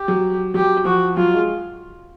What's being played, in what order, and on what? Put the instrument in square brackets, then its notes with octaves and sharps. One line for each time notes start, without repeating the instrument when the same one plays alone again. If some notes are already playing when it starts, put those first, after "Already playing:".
Already playing: [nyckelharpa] G4
[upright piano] F#3
[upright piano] F#3 [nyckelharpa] G4
[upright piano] F3 [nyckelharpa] F#4
[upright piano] F#3 [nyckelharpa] F4
[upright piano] G#3